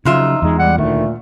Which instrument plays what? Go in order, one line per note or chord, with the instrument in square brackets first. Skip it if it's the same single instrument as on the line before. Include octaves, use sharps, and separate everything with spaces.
[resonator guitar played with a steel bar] F2 F4 E5 [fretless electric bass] C#3 F#3 [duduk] D#4
[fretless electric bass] E2 G#3 [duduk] D#4
[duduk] G3 [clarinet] F#5
[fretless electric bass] D2 D#3 [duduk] A#2 [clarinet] A3